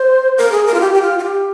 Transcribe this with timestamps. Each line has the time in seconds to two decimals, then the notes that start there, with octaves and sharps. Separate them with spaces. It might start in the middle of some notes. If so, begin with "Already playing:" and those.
Already playing: C5
0.38 A#4
0.52 G#4
0.66 A#4
0.74 F4
0.80 G4
0.94 G4
1.02 F4
1.19 F4
1.23 G4